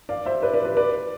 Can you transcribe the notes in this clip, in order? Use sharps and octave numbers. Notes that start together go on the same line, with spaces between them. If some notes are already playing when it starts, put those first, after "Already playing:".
D5 F5
C5 E5
B4 D5
B4 D5
B4 D5
B4 D5